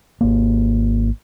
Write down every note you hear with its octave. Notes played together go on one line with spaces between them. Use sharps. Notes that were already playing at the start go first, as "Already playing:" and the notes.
G#1 A#3